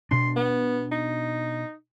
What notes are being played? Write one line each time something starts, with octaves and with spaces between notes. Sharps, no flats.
B2 D4 C6
B3
D#4